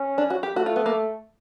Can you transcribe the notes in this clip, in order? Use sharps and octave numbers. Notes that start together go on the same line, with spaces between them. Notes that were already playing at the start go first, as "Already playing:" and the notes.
Already playing: C#4
D4
F#4
G4
A3 F#4
F4
B3
A#3